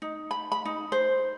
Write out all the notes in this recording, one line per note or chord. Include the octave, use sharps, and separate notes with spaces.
D#4
B5
B5
D#4
C5